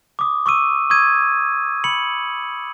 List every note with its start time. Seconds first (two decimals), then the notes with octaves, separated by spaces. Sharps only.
0.19 D6 D#6
0.46 C#6 D6 E6 D#7
0.90 C#6 D#6 E6 G#6 D#7
1.84 B5 C#7 F#7